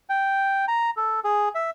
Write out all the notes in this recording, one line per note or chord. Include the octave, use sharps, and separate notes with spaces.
G5
A#5
A4
G#4
E5